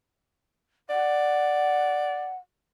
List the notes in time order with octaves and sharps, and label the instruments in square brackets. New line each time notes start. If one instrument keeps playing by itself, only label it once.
[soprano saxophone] D5 [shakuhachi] F#5